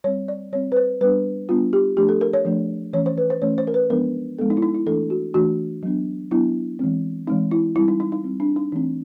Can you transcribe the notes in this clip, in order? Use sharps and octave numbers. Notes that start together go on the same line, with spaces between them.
G3 C4 C#5
D5
G3 C4 C#5
B4
C5
G3 B3 D4 B4
G3 B3 D4 F4
G4
F3 A3 D4 G4
A4
A#4
C#5
F3 A3 D4
E3 A3 C#4 C#5
C5
B4
C5
E3 A3 C#4 C#5
C5
A#4
B4
F3 G#3 B3 D4 A#4
F3 G#3 B3 D4 A4
D#4
E4
D#4
E4
E3 A3 D4 A4
F#4
E3 A3 D4 F#4
F#3 B3 D4
F#3 B3 D4 E4
E3 G#3 C4
E3 G#3 C4 D#4
E4
G3 C4 E4
D#4
D#4
D#4
G3 C4
D4
D#4
E3 A3 C4 D#4